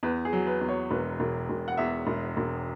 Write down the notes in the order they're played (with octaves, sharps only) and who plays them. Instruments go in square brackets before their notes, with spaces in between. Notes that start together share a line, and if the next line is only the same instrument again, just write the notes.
[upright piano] E2 B4
G#4
F#3
B4
E2
C#5
E1 B4
E1
E1
F#5
E2 E5
E1
E1